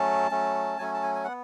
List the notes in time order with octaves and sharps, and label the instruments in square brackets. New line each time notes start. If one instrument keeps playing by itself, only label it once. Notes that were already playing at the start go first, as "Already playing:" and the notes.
Already playing: [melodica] F#3 A3 C#4 A5
F#3 A3 C#4
F#3 A3 C#4 G#5
A5
G#5
G#5
B3 F#5